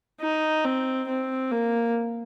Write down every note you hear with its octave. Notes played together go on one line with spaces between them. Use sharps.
D#4
C4
C4
A#3